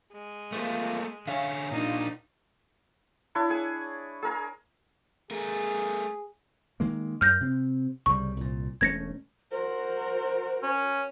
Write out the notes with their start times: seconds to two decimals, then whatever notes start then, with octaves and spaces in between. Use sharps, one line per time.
0.13 G#3
0.52 E3 F3 A3 A#3 F4
1.27 D3 C#5 E5 F5 G#5
1.71 A#2 D4 D#4 F4
3.35 D4 E4 C#5
3.50 G#4 G#5
4.22 G#4 A#4 G#5
5.31 A3 G#4 A#4
6.80 D#3 G#3 A#3
7.21 F#2 F6 G6 A#6
7.41 C3 C4
8.06 C2 C#3 G3 C#6
8.37 C2 A#2
8.81 E1 A3 C#4 G#6 A#6 C#7
9.51 F#4 A#4 C5
10.63 C#4